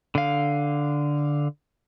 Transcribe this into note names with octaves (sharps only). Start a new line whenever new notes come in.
D3 F5